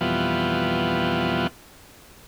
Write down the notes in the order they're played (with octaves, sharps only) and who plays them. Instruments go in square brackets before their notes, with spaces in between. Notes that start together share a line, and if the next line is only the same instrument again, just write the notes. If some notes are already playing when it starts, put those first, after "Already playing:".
[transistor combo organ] F2 B2 E3 G3 B3 F4